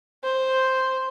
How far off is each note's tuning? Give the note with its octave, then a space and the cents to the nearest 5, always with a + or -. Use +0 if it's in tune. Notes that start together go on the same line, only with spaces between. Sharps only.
C5 +0